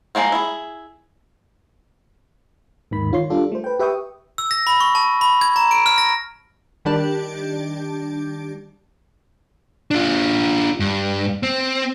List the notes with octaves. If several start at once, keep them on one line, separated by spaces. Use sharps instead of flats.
F3 G3 G#3 A#3 C4
E4 G#4
D#2 G#2 D#3 B5
D#3 F4 C#5 C6
G3 D4 F4 A4 D5
A3 C5
B4 G5
G4 B4 E5 G5 C#6 D#6
E6
A#6
B5
C#6
A5
B5
G#6
A#5
D7
F6
A#6
D#3 G3 D4 G4 D5 A5
D4 F4
G2
C4